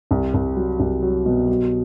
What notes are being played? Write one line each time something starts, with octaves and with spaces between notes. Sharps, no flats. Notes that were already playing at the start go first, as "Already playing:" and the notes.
C2
C2
F#3
C2
F#3
B2
F#3